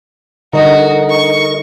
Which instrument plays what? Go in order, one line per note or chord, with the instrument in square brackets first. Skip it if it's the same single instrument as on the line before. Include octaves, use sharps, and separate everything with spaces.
[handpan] D3 G3 D#5 [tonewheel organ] D#4 A#4 [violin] F#4
[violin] C#6